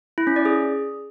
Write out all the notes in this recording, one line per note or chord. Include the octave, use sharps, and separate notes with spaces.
E4
C#4
D5
G#4